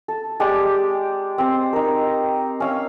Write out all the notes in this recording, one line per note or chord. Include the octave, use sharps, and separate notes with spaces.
A4
G#3 G4 D5
C4 C5
D#4 A#4
C#4 F5 E6